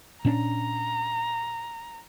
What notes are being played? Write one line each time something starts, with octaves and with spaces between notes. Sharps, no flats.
A#2 C#4 D4 A#5